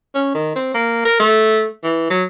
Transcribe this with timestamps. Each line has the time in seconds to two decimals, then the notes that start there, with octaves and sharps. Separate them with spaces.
0.15 C#4
0.35 D#3
0.56 C4
0.74 A#3
1.05 A#4
1.19 A3
1.83 E3
2.10 F#3